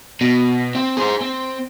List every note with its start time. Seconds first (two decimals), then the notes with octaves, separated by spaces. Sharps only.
0.21 B2
0.75 C4
0.97 G#4 C5
1.21 C4